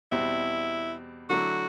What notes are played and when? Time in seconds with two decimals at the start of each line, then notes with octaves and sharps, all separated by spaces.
0.12 E2 B2 G3 C4 E4
1.30 D3 F#3 A3 E4 F#4